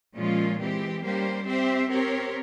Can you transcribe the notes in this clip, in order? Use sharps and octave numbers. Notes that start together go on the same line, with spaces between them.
A#2 F3 G#3 C#4 F4
E3 G#3 C4 G4
G3 A#3 C#4 G4 C5
C4 G4 C5 E5
C4 G4 A#4 C#5